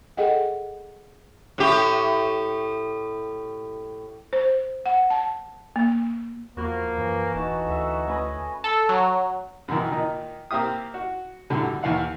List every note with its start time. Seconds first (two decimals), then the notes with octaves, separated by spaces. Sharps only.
0.17 G#4 A4 D#5 E5 F#5 G5
1.58 A2 G4
4.33 C5
4.86 F#5
5.10 A5
5.76 A#3
6.57 E2 F3 A#3 F#4 B5
6.98 F#2 E3
7.34 D#1 D#4 E4 F#4 A5
7.67 D2 A4 E5
8.07 A3 C#4 B4 D#5
8.64 A4
8.89 F#3
9.68 F#2 B2 D#3 E3
9.92 A#2 D#3 D#4
10.51 A#3 C4 G4 E5 D#6
10.94 F#4
11.50 F#2 A2 D3 F#3 G3
11.83 D#2 E3 F5 F#5